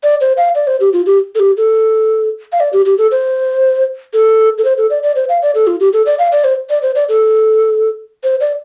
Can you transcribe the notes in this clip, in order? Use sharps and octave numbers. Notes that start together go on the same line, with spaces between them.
D5
C5
F5
D5
C5
G4
F4
G4
A4
G4
A4
F5
D5
G4
G4
A4
C5
A4
A4
C5
A4
D5
D5
C5
F5
D5
A4
F4
G4
A4
D5
F5
D5
C5
D5
C5
D5
A4
C5
D5